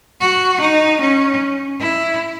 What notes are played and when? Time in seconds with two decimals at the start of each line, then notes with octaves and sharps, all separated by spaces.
0.20 F#4
0.60 D#4
1.01 C#4
1.80 E4